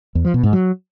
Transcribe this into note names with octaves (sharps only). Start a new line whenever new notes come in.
E2
F3
B2
G#2
F#3